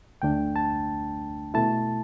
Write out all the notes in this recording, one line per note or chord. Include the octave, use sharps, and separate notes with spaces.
D2 D3 A3 D4 G5
A5
B2 A3 E4 A5